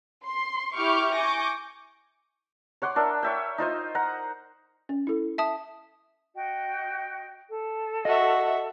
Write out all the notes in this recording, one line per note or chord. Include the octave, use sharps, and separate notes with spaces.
C6
E4 G4 C#6 D6 F6 G6
G#5 C#6 D6 G6 A#6
C#5 F#5 C6 D6
D4 A#4 E5
C#5 E5 G5
D#4 F4 C5 D#5
F#5 A#5
C#4
E4 A4
E5 A5 D#6
F#4 D#5 G5
A4
F#4 D#5 E5